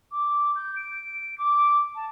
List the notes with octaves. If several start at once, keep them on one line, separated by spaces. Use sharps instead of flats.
D6
G6
D7
D6
A5